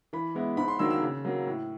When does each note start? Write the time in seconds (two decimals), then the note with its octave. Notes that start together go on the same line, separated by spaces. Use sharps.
0.13 E3 B5
0.35 G#3 B3 E4
0.57 G#2 B5
0.68 C6
0.79 D#3 F#3 A#3 D4 E6
0.90 E6
1.01 C#3
1.25 F#3 A#3
1.46 A2